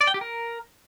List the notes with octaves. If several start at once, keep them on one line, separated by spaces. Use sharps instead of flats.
D5
G5
G4
A#4